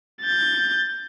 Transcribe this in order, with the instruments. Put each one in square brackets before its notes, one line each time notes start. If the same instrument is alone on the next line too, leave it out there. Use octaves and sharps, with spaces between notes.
[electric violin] G6 A6